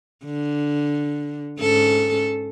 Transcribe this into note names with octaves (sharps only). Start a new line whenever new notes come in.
D3
G#2 C#4 A4